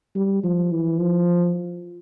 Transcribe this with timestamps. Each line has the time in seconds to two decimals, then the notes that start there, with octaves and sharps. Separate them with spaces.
0.16 G3
0.44 F3
0.72 E3
0.99 F3